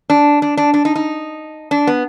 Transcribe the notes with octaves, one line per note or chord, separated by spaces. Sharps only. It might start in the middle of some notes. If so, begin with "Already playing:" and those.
D4
D4
D4
D4
D#4
D#4
D4
B3